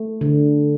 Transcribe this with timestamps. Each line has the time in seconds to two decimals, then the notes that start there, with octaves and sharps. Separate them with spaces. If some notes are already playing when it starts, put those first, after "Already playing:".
Already playing: A3
0.21 D3